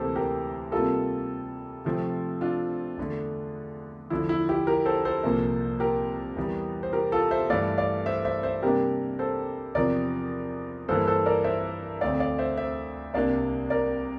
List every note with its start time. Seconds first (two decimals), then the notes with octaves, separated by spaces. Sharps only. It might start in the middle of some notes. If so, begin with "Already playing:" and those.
Already playing: D2 C3 E3 A#3 G4 A4 C5
0.16 G4 A#4
0.72 C3 G3 A#3 F4 A4
1.85 C3 F3 A3 C4
2.41 D4 F4
2.97 E2 D3 A3
4.10 E2 D3 F3 E4
4.29 E4
4.49 E4 G4
4.67 G4 A#4
4.86 A4 C5
5.05 A4 C5
5.23 C2 A#2 F3 A#3
5.80 G4 A#4
6.37 E2 E3 G3
6.83 C5
6.93 G4 A#4
7.12 F4 A4
7.31 C5 E5
7.50 G2 E3 A3 D5 F5
7.78 D5 F5
8.06 C5 E5
8.25 C5 E5
8.43 C5 E5
8.63 C3 G3 A#3 D4 G4 A#4
9.19 A4 C5
9.75 E2 C3 F3 A#4 D5
10.88 G2 E3 A#3 A4 C5
11.07 A4 C5
11.26 A#4 D5
11.44 C5 E5
12.01 D2 D3 A3 C4 D5 F5
12.20 D5 F5
12.38 C5 E5
12.57 C5 E5
13.14 C2 C3 G3 A#3 D4 D5 F5
13.70 A#4 D5